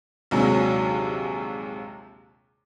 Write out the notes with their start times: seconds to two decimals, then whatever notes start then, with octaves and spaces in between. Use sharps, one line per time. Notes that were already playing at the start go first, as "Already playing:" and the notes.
0.31 A#1 D#2 C3 F#3 G#3